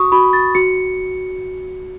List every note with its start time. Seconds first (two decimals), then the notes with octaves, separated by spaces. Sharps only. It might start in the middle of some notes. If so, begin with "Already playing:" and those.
Already playing: F#4 C#6 D#6
0.12 F#4 B5
0.33 A6
0.55 F#4 C#7